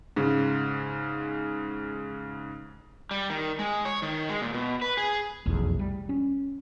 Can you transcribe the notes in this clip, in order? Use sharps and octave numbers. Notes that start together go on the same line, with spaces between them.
G#2 C#3
G3
D#3
G#3
C#5
D#3
G#3
A#2
B2
B4
G#4
F1 B1 E2
G3
C#4